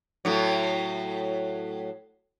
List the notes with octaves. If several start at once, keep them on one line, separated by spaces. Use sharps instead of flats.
A2 F#3